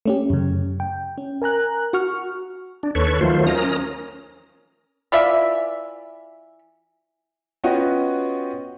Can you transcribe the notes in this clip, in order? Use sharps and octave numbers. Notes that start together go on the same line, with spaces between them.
A3 C#4 G4
F#2 C#3
G5
C#4
A#4 G#5 A#5 F#6
F#4 C#6 F6
D4
D#2 A4 B4 C#5 C#6
D#3 F3 F#3 A3 F4 C5
C#4 A#4 A#5 D#6
E3 F4 D5 E5
B3 C#4 F4 F#4 D#5 G5